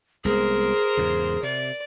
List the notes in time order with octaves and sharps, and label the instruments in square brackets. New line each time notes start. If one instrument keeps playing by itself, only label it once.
[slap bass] C2 G#3 B3 [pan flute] G#4 [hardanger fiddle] A#4 C5
[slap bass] E2 G#2 C#3
[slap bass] C3 [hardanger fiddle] D5